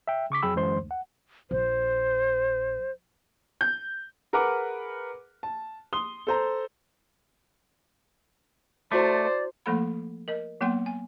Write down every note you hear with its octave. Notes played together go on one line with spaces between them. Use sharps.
E5 G5
C#3 C#6 D6 B6
F2 F#3 G#4 G5 B5 E6
G1 F#2 E3 G#3 C5 C6
D2
F#5
A#1 C5
G6
G#4 A#4 B4 F#5 A#5 D6
A5
C6 D#6 G7
A4 C5 A#5
A3 E4 F#4 C5 D5 D6
F3 A3 A#3 A4 F#5 B5
A#4 D#5
F#3 A#3 B3 G5 C6
G#5